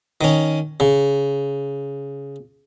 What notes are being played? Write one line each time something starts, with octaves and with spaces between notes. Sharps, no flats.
D#3 C#4
C#3